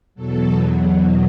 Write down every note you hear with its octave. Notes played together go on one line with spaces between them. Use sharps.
E2 B2 F#3 A4